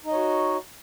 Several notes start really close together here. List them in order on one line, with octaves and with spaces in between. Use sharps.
D#4 D#5 C#5 F#4